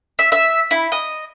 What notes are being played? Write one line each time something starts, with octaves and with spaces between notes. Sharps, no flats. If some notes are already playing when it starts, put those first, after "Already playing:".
E5
E5
E4
D#5